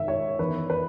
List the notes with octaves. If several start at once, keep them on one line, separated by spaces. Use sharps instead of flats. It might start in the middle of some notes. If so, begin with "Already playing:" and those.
Already playing: G#2 D#3 E5
C#5
E2 D#3 B4
B4